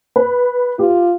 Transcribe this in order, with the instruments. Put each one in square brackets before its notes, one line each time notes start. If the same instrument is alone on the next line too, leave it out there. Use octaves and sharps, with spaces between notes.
[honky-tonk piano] B4
[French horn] F4 [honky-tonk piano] G4